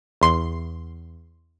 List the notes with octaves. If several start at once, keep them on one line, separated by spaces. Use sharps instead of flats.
E2 C6